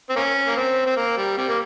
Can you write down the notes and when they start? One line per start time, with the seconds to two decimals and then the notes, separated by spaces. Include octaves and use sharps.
0.09 C4
0.16 A#3 C#4
0.47 A#3
0.56 C4
0.86 C4
0.96 A#3
1.17 G3
1.38 C3 G3
1.49 A#3